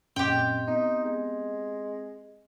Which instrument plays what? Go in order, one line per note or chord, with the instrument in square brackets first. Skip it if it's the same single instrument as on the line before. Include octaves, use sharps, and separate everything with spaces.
[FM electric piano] F#2 A#2 C#4 [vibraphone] C4 D#5 C6 [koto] G4 G5
[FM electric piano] B3 [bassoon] D#4
[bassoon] G#3